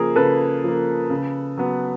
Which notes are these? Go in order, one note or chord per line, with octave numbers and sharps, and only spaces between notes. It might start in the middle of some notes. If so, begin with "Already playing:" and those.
Already playing: C#3 F3 A#3 G#4 A#4
C#3 A4 B4
F3 A#3
C#3
F#3 B3